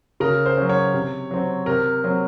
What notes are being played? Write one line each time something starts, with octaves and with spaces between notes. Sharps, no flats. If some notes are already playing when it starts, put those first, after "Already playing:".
C#3 A#4
C5
F#3 C#4
C#5
C3
F#3 C4
C3 A#4
F#3 C4